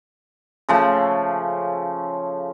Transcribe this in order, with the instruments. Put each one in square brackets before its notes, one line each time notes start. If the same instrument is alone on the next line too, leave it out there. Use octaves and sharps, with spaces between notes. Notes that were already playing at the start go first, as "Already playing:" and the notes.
[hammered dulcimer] C#3 F3 A3